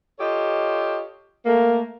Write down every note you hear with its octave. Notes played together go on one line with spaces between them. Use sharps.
F4 G4 A4 C#5 D#5
A3 A#3